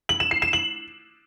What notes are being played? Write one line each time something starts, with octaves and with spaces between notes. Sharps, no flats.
F#7
E7
C7
E7
F#7